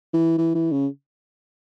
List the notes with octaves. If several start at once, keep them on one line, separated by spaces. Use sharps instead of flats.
E3
E3
E3
C#3